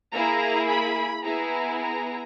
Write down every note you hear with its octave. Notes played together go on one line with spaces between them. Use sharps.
A#3 E4 G#4 A#5
B5
B3 E4 G#4 A#5
A#5